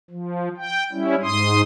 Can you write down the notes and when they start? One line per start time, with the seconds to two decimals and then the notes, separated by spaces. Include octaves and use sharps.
0.10 F3
0.57 G5
0.93 G3 C#4 E4
1.23 G#2 C6 D#6